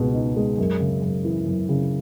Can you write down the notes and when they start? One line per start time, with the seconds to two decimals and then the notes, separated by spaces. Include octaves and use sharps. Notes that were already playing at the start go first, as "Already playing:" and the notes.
Already playing: C#2 B2 G#3
0.14 D#4
0.36 G#3
0.58 F#2
0.80 C#3
1.02 F#2
1.25 E3
1.46 F#2
1.69 C#3